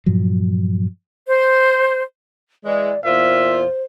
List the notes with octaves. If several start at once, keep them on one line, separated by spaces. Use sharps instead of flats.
G2 A#2 F3 F#3
C5
E3 G#3 D5
E2 A#2 F4 C5 E5